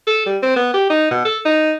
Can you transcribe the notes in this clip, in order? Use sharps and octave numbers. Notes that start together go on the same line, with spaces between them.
A4
G3
C4
B3
G4
D#4
B2
A4
D#4